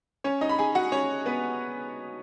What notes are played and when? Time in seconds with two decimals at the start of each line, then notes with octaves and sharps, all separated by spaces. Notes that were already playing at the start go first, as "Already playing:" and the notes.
0.24 C#4 C#5
0.41 D#4 D#5
0.49 B5
0.58 G#4 G#5
0.75 F#4 F#5
0.92 C#4 C#5
1.26 B3 B4